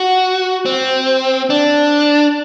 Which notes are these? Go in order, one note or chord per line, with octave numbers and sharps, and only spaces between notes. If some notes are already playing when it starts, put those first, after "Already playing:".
Already playing: F#4
C4
D4